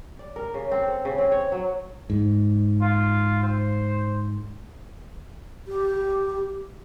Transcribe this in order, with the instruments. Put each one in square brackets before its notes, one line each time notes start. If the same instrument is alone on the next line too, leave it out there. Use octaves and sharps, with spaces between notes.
[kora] D5
A#4
C#3
C4
A4
C#3
C4
C#5
F#3
[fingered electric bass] G#2
[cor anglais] F4
C5
[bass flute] G4